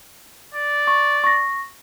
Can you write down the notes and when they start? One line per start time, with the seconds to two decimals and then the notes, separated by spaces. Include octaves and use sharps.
0.54 D5
0.87 C#6
1.24 C#6 A#6